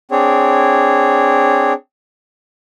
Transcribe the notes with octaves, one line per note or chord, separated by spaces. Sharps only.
C4 D4 G#4 C#5